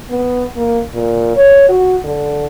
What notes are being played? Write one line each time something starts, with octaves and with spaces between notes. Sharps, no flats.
B3
A#3
A#2
C#5
F#4
D3